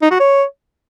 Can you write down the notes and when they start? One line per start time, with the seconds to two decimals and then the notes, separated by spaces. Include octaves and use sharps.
0.02 D#4
0.11 F#4
0.20 C#5